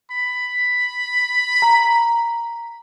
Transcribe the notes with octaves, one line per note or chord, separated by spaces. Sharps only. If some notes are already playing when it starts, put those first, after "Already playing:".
B5
A#5